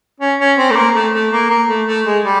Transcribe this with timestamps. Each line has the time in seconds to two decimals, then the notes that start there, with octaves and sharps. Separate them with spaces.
0.20 C#4
0.39 C#4
0.57 C4
0.70 A3
0.76 A#3
0.94 A3
1.13 A3
1.32 A#3
1.50 A#3
1.69 A3
1.87 A3
2.06 G#3
2.24 G3